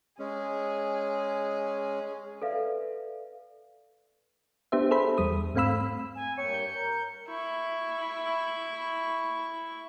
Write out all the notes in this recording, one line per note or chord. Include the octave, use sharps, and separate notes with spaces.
G#3 C#4 G#4
A4 B4 D5 E5 F5
B3 D4 G4 C5 E5
G#4 A4 C5 E5 B5
E2 G3 D#6
G#2 A3 C4 F5 B5 E6
G#5
G2 A#3 C#5 G5 C#7
G6
A#4
E4 C#6